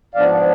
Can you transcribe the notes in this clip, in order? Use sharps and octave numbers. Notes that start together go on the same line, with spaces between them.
G#2 F3 B3 D4 D5 F5